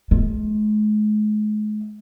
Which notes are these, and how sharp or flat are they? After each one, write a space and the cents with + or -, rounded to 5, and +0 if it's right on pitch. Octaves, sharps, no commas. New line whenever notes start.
G#3 +40